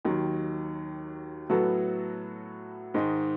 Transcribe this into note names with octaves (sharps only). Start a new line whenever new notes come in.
D#2 D#3 F#3
A2 F#3 B3 F#4 A4
G#2 D#3 G#3 D#4